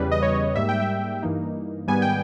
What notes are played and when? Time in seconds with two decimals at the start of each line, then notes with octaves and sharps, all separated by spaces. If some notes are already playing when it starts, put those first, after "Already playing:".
Already playing: E2 C#3 G3 B4
0.11 D#5
0.22 C#5
0.55 G#2 G3 A#3 E5
0.69 G5
0.80 E5
1.23 G2 E3 A#3 D#4
1.88 G#2 D#3 G3 B3 G#5
2.02 G5